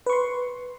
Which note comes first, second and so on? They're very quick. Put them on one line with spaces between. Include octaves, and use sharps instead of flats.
B4 C#6 C6